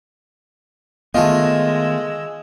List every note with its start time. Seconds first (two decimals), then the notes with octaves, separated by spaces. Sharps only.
1.14 D#3 G#3 A3 B3 F4 D#5 E6